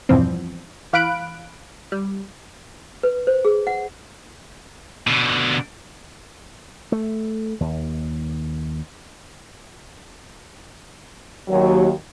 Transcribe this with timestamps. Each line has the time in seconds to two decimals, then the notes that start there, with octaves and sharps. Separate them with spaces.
0.09 E2 G2 B2 E3 F3 C4
0.93 E3 F5 B5 F#6 D7
1.92 G3
3.03 B4
3.27 C5
3.45 G#4
3.67 F#5
5.07 B2 D3
6.92 A3
7.60 D#2
11.48 D#2 F#3